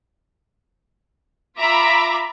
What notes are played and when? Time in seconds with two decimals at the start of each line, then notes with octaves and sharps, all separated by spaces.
1.58 F4 E5 A#5 B5 D6